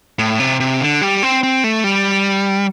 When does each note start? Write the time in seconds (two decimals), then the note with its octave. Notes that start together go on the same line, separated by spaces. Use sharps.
0.19 A2
0.40 C3
0.60 C3
0.81 D3
1.02 G3
1.23 C4
1.43 C4
1.64 A3
1.84 G3